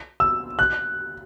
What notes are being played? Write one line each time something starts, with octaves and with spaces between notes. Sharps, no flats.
E6
F#6